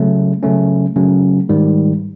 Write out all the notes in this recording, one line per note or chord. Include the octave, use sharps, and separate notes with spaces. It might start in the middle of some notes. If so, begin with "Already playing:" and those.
Already playing: C#3 F#3 A3 C#4
C#3 F#3 A3 C#4
C#3 F#3 A3 C#4
G#2 D#3 G3